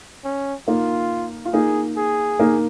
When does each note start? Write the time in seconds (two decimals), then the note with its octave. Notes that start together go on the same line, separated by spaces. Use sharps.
0.24 C#4
0.68 A#3 D#4 F4
1.45 F4
1.53 A#3 D#4 G#4
1.97 G#4
2.39 A#3 D#4